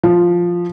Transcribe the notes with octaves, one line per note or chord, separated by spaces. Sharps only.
F3